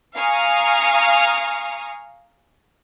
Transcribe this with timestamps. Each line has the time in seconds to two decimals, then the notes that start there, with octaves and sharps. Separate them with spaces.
0.17 F5 G#5 A#5 C#6 D#6 F6